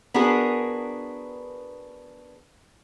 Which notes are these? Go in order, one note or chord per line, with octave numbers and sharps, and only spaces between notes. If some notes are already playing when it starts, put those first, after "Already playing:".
B3 D4 F#4 G#4 A#4